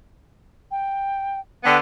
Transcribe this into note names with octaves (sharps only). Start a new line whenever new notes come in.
G5
D3 B3 G5